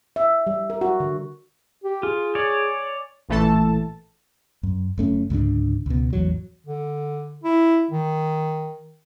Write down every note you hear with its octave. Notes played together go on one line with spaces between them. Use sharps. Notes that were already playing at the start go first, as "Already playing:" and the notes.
E5
G3
A#4
F#4
D3
G4
F4 G#4
C#5 D5 G#5
A1 A#2 E3 A3 A4 A5
F#2
F#1 A3 C#4
C#2 G#2 D3 D4
C#2 B2
A1 E2 F#3
D3
E4
D#3